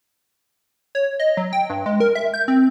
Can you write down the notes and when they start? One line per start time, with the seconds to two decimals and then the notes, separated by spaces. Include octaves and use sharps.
0.95 C#5
1.20 D#5
1.37 F#3
1.53 G5
1.70 G2
1.86 G#3
2.00 A#4
2.15 E5
2.34 G6
2.48 C4